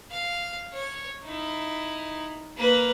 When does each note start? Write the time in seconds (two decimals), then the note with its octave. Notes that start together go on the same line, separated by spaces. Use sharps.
0.11 F5
0.73 C#5
1.25 D#4 E4
2.57 A#3 B4